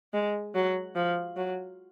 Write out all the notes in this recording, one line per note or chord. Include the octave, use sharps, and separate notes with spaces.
G#3
F#3
F3
F#3